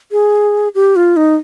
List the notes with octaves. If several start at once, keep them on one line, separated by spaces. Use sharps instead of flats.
G#4
G4
F4
D#4